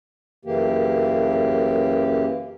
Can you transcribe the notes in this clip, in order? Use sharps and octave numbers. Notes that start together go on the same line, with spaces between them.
F#2 C#3 E3 A#3 G4